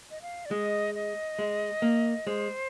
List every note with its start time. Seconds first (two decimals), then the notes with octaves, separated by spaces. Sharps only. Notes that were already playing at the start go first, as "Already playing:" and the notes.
0.11 D#5
0.22 F5
0.45 D5
0.51 G#3 D#5
0.94 D#5
1.39 G#3
1.82 A#3
2.27 G#3 C5